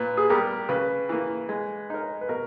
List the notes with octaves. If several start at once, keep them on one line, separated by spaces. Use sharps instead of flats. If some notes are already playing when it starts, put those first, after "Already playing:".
Already playing: A#2 B4
G#4
G3 B3 G4 A#4
C#3 B4
E3 A#3
G#3
D#4 A#4
B4
B2 A#4